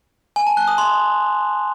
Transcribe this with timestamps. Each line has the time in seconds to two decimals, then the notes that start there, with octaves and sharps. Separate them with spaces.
0.36 G#5
0.47 A5
0.57 F#6
0.68 D#6
0.78 C6